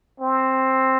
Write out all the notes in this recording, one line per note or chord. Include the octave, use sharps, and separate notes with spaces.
C4